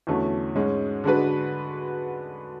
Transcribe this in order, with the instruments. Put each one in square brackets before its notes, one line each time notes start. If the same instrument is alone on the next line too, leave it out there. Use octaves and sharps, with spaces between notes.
[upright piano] E2 D3 A3 C#4 F#4
G#2 G#3 C#4
D3 G#3 D4 F#4 B4